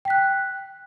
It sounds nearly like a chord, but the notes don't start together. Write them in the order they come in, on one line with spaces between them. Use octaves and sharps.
G5 B6 F#6